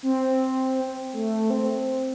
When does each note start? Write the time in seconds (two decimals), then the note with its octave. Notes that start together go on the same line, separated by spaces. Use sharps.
0.03 C4
1.13 A3
1.50 C4